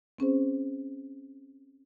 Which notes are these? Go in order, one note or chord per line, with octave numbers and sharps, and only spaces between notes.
C4 C#4 G#4 C5